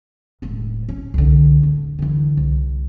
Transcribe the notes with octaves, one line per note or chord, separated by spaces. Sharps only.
E1 A2
C#4
C2 D3
D1
D3 E3
C2